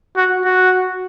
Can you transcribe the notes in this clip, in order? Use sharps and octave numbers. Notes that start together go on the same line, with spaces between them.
F#4
F#4